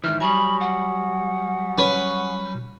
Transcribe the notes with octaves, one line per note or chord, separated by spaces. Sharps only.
G#2 D#3 E3 E5 F6
F#3 G3 G#5 B5 C#6 D#6
F#5
C#4 B4 C#5